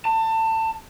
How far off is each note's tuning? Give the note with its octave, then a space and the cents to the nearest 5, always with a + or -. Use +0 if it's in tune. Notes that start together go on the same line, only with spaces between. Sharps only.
A5 +25